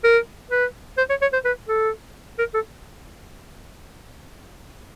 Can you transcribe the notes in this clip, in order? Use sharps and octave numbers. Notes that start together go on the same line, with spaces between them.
A#4
B4
C5
C#5
C#5
C5
B4
A4
A#4
A4